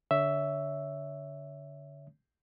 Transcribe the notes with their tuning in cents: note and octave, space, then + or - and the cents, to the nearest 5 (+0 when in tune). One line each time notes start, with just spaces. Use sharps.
D3 -20 C#5 +25 E5 +0